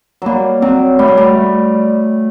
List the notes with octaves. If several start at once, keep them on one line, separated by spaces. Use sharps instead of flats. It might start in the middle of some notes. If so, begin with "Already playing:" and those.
F#3 G3 A#3
F#3 C4
G3 A3
F#3
G3
A3